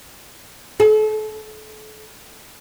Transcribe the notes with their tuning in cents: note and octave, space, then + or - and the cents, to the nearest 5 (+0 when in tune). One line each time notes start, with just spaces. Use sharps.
A4 -35